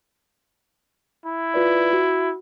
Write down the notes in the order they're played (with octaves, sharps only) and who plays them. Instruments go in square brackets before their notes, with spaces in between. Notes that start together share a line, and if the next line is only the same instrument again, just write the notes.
[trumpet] E4
[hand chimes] F4 B4 D5
F#4